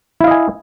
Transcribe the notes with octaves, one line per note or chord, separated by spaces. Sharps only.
E4 D#5 F5 G#5